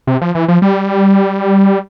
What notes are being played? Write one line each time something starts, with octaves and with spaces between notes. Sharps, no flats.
C3
F3
E3
F3
G3